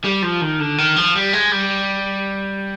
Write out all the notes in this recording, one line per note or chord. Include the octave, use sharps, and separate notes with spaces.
G3
F3
D#3
D3
D#3
F3
G3
G#3
G3